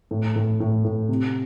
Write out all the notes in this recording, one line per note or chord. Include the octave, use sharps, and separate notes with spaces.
A2
A2
A2
A2
C3